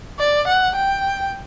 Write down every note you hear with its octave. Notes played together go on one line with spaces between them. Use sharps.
D5
F#5
G5